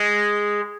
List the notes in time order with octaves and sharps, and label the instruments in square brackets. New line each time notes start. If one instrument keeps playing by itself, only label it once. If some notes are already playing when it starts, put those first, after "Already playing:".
Already playing: [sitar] G#3